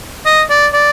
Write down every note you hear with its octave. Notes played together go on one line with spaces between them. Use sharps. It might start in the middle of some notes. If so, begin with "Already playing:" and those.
D#5
D5
D5